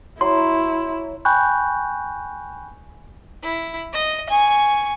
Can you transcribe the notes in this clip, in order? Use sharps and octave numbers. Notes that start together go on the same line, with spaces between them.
F#3 E4 C6
G5 G#5 B5 C#6 F#6 G6
E4
D#5
G#5 C#6